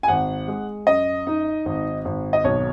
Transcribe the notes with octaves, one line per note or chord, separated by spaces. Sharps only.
G#5
G#1 F#5
G#3
F#2 D#5
D#4
G#1
G#1
D#5
B1 C#5